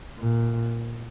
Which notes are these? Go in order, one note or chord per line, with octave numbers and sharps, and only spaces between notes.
A#2